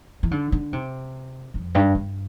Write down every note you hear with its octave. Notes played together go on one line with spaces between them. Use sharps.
E3
D3
D3
C3
F2
G2
G2